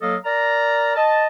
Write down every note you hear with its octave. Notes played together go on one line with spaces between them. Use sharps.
F#3 A#3 A4 D#5 F5
A#4 D5 A#5
D#5 A5